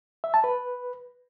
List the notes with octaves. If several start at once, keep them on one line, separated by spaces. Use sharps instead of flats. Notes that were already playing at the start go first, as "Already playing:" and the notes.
E5
A5
B4